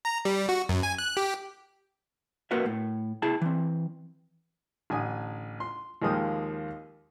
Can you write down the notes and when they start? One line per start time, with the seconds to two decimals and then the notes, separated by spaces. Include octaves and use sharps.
0.05 A#5
0.25 G3
0.49 F#4
0.69 F#2
0.83 G#5
0.98 F#6
1.17 G4
2.51 A#3 F#4 A#4 B4 E5
2.66 A2
3.22 E4 G#4 A5
3.42 E3 C4
4.90 A1 D3 G#5 D#6
5.60 C6
6.02 D#2 F3 G#3 A#3 G5 D#6